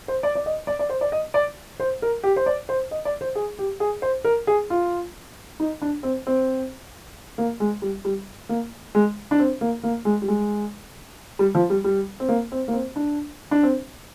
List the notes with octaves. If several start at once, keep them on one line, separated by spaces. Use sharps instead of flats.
C5
D5
D5
D#5
D5
D5
C5
D5
D#5
D5
C5
A#4
G4
C5
D5
C5
D#5
D5
C5
G#4
G4
G#4
C5
A#4
G#4
F4
D#4
D4
C4
C4
A#3
G#3
G3
G3
A#3
G#3
D4
C4
A#3
A#3
G#3
G3
G#3
G3
F3
G3
G3
C4
A#3
C4
A#3
C4
D4
D4
C4